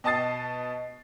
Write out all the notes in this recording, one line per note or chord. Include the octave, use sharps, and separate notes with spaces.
B2 D#5 A5 D#6 A6 C7